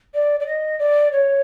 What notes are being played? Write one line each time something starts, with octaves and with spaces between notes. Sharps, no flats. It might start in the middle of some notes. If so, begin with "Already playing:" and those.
D5
D5
D#5
D5
C#5